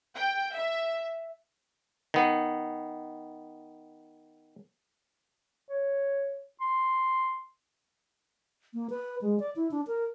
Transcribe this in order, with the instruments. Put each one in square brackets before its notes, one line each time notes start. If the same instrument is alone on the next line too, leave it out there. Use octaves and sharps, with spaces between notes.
[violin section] G5
E5
[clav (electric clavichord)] D#3 B3
[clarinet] C#5
C6
[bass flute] A#3
B4
G#3
D5
E4
D4
A#4